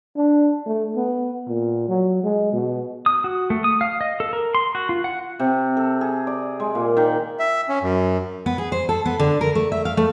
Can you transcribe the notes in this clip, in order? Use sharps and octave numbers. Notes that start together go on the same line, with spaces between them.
D4
A3
B3
A#2
F#3
G#3
B2
D#6
F#4
A3
D#6
F5
D#5
A4
A#4
C6
F#4
F4
F#5
C3
A4
G#4
D5
G#3
A#2
D#3
E5
C#4
F#2
B3
G#4
C5
A4
B3
D3
A#4
A3
E5
F5
A3